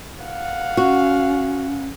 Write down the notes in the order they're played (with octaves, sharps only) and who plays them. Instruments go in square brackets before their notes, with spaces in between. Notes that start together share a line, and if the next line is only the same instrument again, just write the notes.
[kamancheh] F5 F#5
[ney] C#4 [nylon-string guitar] F#4